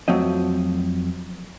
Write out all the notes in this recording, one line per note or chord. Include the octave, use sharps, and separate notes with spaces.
F2 F#3 A3 C4 D#5